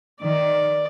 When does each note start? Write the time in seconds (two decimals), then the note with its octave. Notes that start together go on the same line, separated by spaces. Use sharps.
0.21 D#3 D5